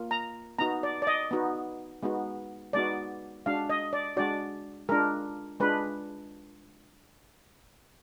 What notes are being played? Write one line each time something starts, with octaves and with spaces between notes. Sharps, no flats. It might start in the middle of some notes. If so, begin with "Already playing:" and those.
Already playing: A#3 F4
A#5
B3 D#4 F#4 A#5
D5
D5
D#5
B3 D#4 F#4
G#3 B3 D#4 F#4
G#3 B3 D#4 F#4 D5
G#3 D4 F#4 F5
D#5
D5
G#3 D4 F#4 D5
G#3 D4 F4 A#4
G#3 D4 F4 B4